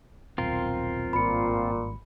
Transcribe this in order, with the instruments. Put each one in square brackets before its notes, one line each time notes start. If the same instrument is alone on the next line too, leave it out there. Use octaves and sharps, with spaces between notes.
[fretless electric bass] D#1 B1 [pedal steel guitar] C4 F4 A#4
[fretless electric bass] G#1 G2 [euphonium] A#2 [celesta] B5 C#7